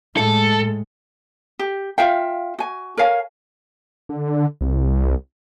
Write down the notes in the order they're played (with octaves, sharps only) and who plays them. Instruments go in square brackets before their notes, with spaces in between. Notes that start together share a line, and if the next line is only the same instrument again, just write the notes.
[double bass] A2 G#3 [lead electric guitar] A4
[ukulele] G4
F4 E5 F5 G5
F#4 G#5
A#4 C#5 F5 G#5
[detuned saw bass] D3
C2